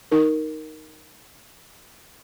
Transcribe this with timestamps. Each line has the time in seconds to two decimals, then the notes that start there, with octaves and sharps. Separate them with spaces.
0.12 D#4 A#4